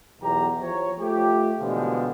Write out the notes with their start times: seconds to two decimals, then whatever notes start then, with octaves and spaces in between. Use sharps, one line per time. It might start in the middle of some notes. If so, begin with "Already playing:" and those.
0.22 B1 E2 G4 A#5
0.61 F3 C5 C#5
1.00 A3 F4 G4
1.61 B2 D3 E3 F3 G#3